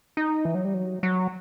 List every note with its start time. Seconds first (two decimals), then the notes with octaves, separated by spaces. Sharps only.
0.17 D#4
0.45 E3
0.55 F#3
0.65 G3
0.74 F#3
1.03 F#3